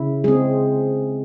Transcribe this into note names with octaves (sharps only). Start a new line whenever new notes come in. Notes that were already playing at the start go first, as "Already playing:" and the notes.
Already playing: C#3 E4
G#3 C4 G#4